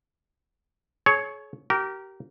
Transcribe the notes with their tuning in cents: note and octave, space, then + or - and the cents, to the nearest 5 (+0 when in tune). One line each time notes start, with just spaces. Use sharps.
G#4 +45 C#5 +0
G4 -30 A#4 +0